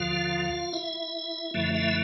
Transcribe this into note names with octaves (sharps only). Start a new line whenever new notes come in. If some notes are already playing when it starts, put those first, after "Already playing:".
Already playing: D#2 D3 F3 F4 F5
E4 E5
F#2 D3 F3 A3 E4 E5
E4 E5